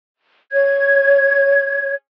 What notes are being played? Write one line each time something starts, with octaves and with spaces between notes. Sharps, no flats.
C#5 G#6